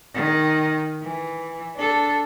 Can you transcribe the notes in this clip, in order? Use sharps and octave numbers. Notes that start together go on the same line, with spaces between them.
D#3
E3
D4 A4